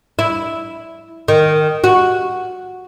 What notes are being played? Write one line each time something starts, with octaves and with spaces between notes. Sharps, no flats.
E4
D#3
F#4